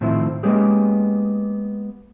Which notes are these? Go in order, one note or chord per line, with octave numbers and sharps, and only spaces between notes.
A2 D#3 F3 C4 E4
G#3 A#3 B3 C#4 G4 G#4